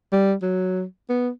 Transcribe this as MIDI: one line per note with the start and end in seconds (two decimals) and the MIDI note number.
0.12 0.34 55
0.42 0.83 54
1.10 1.29 59